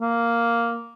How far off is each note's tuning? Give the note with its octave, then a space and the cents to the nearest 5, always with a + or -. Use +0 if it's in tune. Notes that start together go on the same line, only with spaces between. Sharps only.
A#3 +0